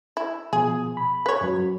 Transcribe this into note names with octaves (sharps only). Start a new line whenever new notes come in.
E4
B2 F3 B3 G#4
B5
B4 C#5
F#2 F#3